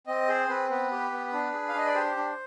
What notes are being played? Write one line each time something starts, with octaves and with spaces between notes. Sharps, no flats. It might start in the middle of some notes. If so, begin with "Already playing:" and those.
C4 D#5
G#4 C5
C4 B4
B3 B4
G4
B3
D4
G#4
F5
D4 D#5
D5
G4 C5
D4